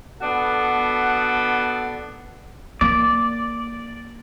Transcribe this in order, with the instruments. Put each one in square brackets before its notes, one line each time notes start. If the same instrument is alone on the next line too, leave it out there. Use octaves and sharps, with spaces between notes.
[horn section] B3 D4 F#4 A4
[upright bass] A#3 [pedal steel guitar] D5